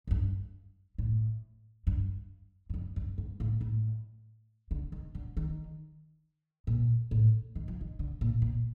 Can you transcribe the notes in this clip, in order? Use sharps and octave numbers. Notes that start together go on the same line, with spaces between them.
F2
G2
A2
G2
G2
F2
G2
G2
A2
A2
D3
D#3
D3
D#3
A#2
A2
D#3
F3
D#3
D3
A#2
A#2